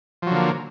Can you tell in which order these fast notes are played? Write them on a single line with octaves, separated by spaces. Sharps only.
F3 F#3 D3 A#3